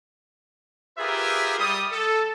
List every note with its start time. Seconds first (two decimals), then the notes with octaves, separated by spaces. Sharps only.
0.98 F4 G4 G#4 A#4 B4 E5
1.59 G3 D#6
1.92 A4